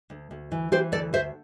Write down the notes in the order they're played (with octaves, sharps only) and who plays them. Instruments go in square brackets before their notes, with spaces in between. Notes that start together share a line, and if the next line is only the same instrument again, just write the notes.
[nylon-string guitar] D2
D2
E3
E3 G4 C5
D2 A4 D5
D2 C5 E5